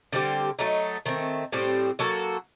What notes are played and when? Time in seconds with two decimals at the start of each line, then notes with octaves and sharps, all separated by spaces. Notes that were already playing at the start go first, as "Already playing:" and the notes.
0.12 D3 G3 C4 G4
0.59 F#3 A3 D#4
1.06 D#3 A3 C4
1.52 A2 G3 C4 G4
1.99 F#3 A#3 F#4 A4